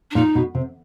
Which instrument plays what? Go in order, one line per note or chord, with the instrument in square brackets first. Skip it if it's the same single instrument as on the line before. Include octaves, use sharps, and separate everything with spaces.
[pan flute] D4
[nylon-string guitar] A#2 [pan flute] D#4
[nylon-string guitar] B2
C3